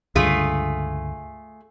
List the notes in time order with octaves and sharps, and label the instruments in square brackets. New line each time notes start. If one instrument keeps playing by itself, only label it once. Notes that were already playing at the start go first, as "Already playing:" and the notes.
[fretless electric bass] C#2 G2 D3 [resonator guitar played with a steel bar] A3 F4 G#4